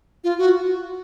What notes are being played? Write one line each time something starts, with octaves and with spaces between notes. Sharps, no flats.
F4
F#4